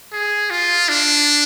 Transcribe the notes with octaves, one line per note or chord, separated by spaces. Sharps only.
G#4
F4
D4